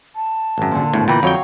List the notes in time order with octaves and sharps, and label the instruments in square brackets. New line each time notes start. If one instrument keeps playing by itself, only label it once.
[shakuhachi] A5
[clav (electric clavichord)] G#1 F#2
[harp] A#2 D3
[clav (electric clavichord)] G#1 D2 A2 [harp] B3
[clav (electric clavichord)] A#2 E3 [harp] G5 A#5 [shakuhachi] B5
[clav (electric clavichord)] F2 G5 [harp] F#3 C#5 F5